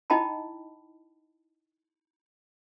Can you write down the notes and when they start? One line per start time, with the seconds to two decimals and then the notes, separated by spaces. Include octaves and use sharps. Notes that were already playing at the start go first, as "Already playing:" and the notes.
0.10 D#4 E4 D#5 G5 A5 B5